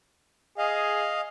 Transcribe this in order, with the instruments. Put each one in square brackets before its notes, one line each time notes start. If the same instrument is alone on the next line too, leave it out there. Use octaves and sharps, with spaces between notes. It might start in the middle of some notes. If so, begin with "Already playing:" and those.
[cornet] G#4 [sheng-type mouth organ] D#5 F5